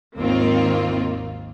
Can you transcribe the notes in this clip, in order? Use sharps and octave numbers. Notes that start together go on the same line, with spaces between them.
G#1 D#2 D#3 A#3 C4 F4